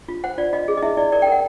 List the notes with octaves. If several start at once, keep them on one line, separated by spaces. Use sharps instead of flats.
F4
C5 F#5
F4 D5
F4 D#5
G#4
D#5
E4 E5
E4 D5
A#4 D5
G5
A#4 F#5